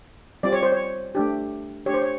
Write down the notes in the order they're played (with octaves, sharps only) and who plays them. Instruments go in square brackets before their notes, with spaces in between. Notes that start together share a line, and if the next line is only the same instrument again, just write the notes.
[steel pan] G3 C4 F4 D5
C#5
C5
C#5
A3 D4 G4
A3 D4 G4 C#5
C5
C#5